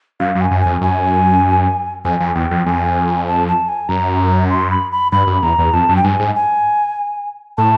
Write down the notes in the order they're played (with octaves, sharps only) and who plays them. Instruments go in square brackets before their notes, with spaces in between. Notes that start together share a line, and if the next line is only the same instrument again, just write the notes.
[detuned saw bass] F#2 [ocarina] F5
[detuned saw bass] F#2
[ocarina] G#5
[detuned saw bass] F#2
[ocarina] G#5
[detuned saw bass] F2
[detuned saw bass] F#2 [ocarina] G#5
[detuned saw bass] F2 [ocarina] G#5
[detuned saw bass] F2
[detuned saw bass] E2 [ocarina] G5
[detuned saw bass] F2
[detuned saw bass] F2 [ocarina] G#5
[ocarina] A5
A5
G#5
[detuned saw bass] F#2 [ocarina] A#5
[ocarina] C6
B5
B5
[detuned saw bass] G2 [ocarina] B5
[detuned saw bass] F#2
[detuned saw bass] E2 [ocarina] A#5
[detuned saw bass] E2
[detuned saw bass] F2 [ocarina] A5
[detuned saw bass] F#2
[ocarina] G5
[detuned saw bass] G2 [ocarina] G#5
[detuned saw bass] G#2
[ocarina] G#5
[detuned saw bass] A2 [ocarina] A5